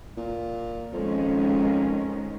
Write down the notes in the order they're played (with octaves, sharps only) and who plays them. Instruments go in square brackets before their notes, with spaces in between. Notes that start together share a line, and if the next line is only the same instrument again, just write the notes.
[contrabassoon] A#2
[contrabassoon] F2 [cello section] D#3 G#3 C#4